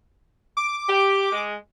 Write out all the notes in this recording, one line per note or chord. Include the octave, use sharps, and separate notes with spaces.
D6
G4
G#3